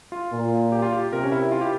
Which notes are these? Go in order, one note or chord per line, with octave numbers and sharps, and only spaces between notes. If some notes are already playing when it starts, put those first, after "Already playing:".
F4
A#2
G4
F4
G4
C3 A#4
C#4
E4
F4
G4